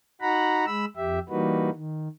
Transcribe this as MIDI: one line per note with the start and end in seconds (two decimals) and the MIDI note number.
0.21 0.65 63
0.21 0.65 66
0.21 0.65 78
0.21 0.65 82
0.21 0.65 83
0.66 0.85 56
0.66 0.85 83
0.66 0.85 88
0.96 1.19 41
0.96 1.19 67
0.96 1.19 76
1.29 1.70 52
1.29 1.70 55
1.29 1.70 58
1.29 1.70 63
1.29 1.70 66
1.29 1.70 71
1.74 2.08 51